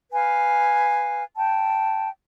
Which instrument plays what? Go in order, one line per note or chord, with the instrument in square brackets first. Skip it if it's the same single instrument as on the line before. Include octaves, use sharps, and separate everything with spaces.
[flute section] B4 F5 G#5
G5 A5